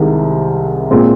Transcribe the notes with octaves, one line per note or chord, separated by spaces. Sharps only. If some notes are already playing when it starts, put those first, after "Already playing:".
Already playing: C2 C3 D#3 G#3
A#2 G#3 C4